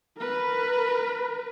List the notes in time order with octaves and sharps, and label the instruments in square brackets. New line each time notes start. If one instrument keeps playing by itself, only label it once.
[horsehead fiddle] A#4 B4